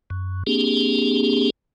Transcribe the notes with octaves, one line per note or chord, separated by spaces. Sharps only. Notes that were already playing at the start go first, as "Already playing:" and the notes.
F#2
A#3 C4 D4 G4 G#4